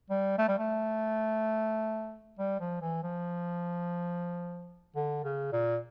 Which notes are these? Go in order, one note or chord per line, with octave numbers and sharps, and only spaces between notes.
G3
A3
G3
A3
G3
F3
E3
F3
D3
C#3
A#2